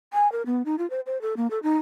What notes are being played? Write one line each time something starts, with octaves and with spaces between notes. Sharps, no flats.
G#5
A#4
B3
D#4
F4
C5
C5
A4
A#3
A4
D#4